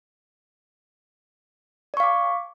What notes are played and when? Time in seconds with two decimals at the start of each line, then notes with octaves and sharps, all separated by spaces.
1.94 D5
1.97 C#6
2.00 F5
2.03 D6